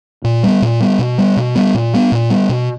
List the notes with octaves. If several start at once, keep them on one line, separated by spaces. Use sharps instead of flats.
A#2
G3 B3
A#2
G3 B3
B2
G3 B3
B2
G3 B3
A#2
G3 B3
A#2
G3 B3
B2